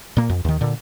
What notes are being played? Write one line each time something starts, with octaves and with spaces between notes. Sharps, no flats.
A#2 A#3
F2
D#2 D#3
A#2 D3